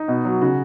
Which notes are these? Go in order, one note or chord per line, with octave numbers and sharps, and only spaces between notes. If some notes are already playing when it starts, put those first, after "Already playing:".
Already playing: D#4
B2
F#3
C#3 F#4